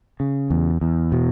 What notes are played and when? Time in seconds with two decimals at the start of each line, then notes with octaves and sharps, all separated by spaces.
0.20 C#3
0.50 E2
0.81 E2
1.12 B2